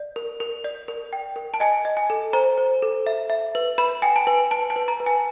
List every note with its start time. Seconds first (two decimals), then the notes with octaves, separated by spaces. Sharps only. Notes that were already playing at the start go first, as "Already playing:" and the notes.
Already playing: D5
0.16 A#4
0.40 A#4
0.64 D5
0.88 A#4
1.13 G5
1.36 A#4
1.54 A5
1.60 D#5 G#5
1.85 D#5
1.97 G#5
2.10 A4
2.33 C5 A#5
2.58 C5
2.82 A4
3.06 E5
3.30 E5
3.55 B4
3.78 B4 B5
4.02 G5 G#5
4.16 A5
4.27 B4 G#5
4.51 B4 A5
4.70 A5
4.76 B4
4.88 A#5
5.00 B4
5.06 G#5